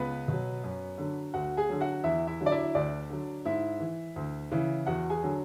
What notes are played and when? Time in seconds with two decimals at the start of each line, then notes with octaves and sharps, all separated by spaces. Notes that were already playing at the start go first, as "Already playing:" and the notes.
Already playing: C#2 B3 B4
0.28 B2 F#3
0.64 F#2
0.98 D3 F#3
1.34 D2 F#4 F#5
1.57 G#4 G#5
1.69 D3 F#3
1.81 F#4 F#5
2.04 E2 E4 E5
2.27 E4 E5
2.40 D3 F#3
2.46 D5
2.52 E4 E5
2.75 D2 D4 D5
3.10 D3 F#3
3.45 G#2 E4 E5
3.80 E3
4.16 D2
4.52 C#3 E3
4.86 E2 F#4 F#5
5.10 G#4 G#5
5.23 D3 F#3